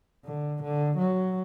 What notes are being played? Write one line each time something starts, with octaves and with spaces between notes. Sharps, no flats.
D3
D3
F#3